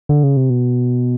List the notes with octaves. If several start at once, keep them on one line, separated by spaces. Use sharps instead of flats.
D3
C#3
C3
B2